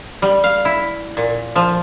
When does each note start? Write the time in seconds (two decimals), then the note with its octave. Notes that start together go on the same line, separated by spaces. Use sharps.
0.22 G3
0.44 F5
0.65 E4
1.17 A#2
1.56 F3